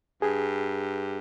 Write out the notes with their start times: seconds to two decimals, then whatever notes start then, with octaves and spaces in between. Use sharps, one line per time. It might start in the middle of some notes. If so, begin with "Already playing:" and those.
0.22 G2 G#4